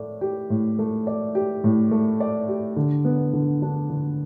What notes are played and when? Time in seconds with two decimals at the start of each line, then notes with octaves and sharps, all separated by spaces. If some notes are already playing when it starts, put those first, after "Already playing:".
Already playing: A2 A3 D5
0.21 G4
0.50 A2
0.79 A3
1.07 D5
1.35 G4
1.64 A2
1.91 A3
2.20 D5
2.48 G4
2.76 D3
3.05 B3
3.33 D3
3.62 D4
3.90 D3